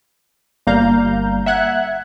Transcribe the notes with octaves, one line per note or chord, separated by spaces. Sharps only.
G1 G3 A#3 F5 A#5 G6
E5 F#5 F#6 G#6